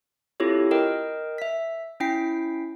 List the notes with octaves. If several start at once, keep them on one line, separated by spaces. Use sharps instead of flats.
C4 E4 F4 G4 A4 C#5
A#4 D#5 G5
E5 B6
C#4 E4 G5 B6 C7